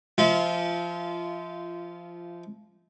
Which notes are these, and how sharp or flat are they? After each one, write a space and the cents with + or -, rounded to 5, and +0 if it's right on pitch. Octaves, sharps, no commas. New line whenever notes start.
F3 -15 F4 -25 E5 -40